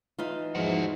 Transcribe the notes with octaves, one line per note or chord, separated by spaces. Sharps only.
E3 D#4 F4
E2 G#2 F3 E4 F#4 C5